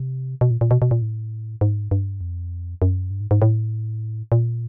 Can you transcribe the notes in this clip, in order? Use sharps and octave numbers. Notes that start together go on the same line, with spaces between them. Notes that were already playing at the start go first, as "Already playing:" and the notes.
Already playing: C3
B2
A#2
A#2
B2
B2
A#2
A2
G#2
G2
F2
F#2
G2
G#2
G#2
A2
A#2